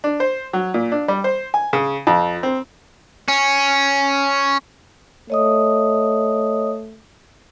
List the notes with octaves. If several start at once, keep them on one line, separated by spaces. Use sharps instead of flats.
D4
C5
F#3
A#2
D4
G3
C5
G#5
C#3
F2
C4
C#4
A3 C#5 D#5 D#6